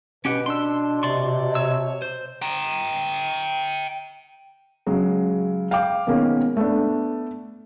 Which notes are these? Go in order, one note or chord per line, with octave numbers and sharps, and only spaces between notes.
B2 C#4 G4 B4 F#5
D4 C6 E6
C3 D5 C6 C#6
C#5 E6
C5
G5 A#5
C#3 F#3 G#3
F5 G5 D6
B2 D#3 G#3 A#3 B3 C#4
A3 B3 D4